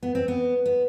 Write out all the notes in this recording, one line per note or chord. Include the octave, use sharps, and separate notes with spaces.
B3
C4
B3
B3